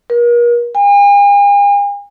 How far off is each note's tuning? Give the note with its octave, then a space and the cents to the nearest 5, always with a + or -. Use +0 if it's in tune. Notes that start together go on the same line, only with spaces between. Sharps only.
A#4 +40
G#5 -45